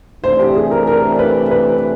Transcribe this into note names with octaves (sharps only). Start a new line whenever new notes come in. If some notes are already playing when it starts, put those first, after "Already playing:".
C3 E3 A3 D4 C5
G4
G#4
A#4
A#4
B4
B4